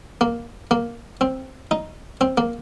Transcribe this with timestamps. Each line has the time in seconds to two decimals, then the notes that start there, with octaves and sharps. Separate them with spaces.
0.21 A#3
0.71 A#3
1.21 C4
1.71 D#4
2.21 C4
2.38 A#3